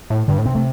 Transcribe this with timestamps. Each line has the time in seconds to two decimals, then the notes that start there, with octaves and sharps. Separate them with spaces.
0.10 A2
0.28 G2 D3
0.39 A2
0.46 C3 C4
0.55 A3